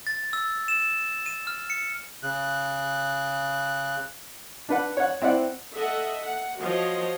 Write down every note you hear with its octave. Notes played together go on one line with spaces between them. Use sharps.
A6
E6
E7
D#7
F6
C#7
C#3 F#6
D4 B4 F#5
C#5 F#5
C4 E4 D5 F#5
A4 D#5 E5 F#5
F#5
F3 F#4 C#5 D#5